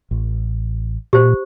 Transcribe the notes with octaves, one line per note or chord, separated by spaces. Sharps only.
A1
A#2 G4 C5